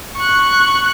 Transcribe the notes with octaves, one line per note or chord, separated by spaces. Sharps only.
C#6 F#6